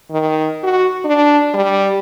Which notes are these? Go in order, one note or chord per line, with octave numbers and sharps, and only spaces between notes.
D#3
F#4
D4
G3